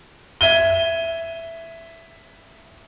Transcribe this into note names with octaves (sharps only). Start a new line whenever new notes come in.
E5 G#6 D#7 G7